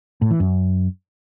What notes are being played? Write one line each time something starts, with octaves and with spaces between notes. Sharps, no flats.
A2
E3
F#2